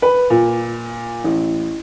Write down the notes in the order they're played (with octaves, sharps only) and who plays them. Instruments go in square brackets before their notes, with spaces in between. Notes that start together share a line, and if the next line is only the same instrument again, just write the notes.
[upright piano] B4
A#2
A1